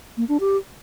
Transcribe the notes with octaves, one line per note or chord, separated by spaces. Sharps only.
A#3
D4
G4